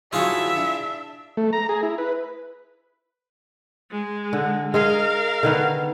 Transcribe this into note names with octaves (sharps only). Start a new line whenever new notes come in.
G2 D#3 F#3 E4 F4 G#4 E5
D4
A3
A#5
G#4
E4
B4
G#3
D3
G#3 G#4 A#4 D#5 F5
D3 D#3 B3